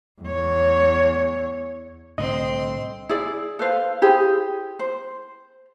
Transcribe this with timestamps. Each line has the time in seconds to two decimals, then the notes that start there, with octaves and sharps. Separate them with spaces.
0.22 E2 C#5
2.18 C2 A2 D3 C4 D#5 C6
3.09 E4 G#4 D5
3.59 A4 B4 C5 F5
4.02 E4 G4 G#4 C5
4.79 C5